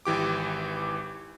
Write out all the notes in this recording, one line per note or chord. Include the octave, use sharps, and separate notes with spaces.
G#1 E3 G4 D6